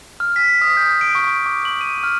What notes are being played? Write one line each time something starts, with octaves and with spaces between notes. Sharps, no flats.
F6
B6
D#6
G6
D7
C#6
D7
D6
F#7
D#7
F6